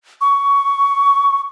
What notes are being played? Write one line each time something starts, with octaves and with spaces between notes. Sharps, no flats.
C#6